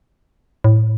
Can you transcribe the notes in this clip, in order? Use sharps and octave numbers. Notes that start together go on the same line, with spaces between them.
A2